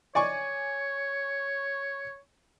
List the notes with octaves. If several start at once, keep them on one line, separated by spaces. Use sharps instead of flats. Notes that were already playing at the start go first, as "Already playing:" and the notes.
C#5 D5 G#5 C#6